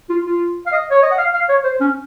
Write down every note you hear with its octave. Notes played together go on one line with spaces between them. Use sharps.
F4
F4
F5
D#5
C#5
D#5
F#5
F5
F5
C#5
C5
C#4